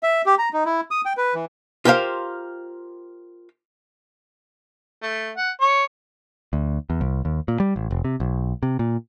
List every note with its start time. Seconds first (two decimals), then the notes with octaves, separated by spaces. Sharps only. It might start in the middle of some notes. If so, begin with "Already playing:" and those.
0.03 E5
0.26 G4
0.38 A#5
0.53 D#4
0.65 E4
0.91 D#6
1.05 G5
1.17 B4
1.34 E3
1.85 F4 G4 A#4 C5 F5
5.02 A3
5.37 F#5
5.61 C#5
6.53 D2
6.90 E2
7.01 C2
7.25 D#2
7.48 A#2
7.60 G3
7.76 A1
7.91 F1
8.05 C3
8.20 B1
8.63 C3
8.79 A#2